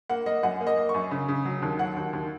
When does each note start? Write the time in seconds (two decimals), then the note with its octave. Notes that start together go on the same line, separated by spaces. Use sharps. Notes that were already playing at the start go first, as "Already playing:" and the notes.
0.09 A#3 F#5
0.26 A#3 D#5
0.43 F#2 F#5
0.61 A#3
0.67 D#5
0.77 A#3
0.89 C#6
0.94 F#2
1.11 C#3
1.28 C#3
1.45 F#3
1.62 D#2
1.79 F#3 F#5
1.97 D#2
2.13 D#2